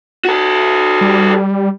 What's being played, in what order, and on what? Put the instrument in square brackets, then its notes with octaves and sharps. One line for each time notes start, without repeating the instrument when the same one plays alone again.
[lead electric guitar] F#4 A4
[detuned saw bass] G3